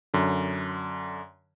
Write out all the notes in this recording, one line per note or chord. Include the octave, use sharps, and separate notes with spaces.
F#2 D3